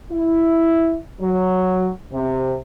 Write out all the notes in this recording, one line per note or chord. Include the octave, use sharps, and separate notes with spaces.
E4
F#3
C3